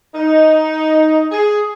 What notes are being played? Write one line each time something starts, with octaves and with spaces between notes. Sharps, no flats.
D#4
G#4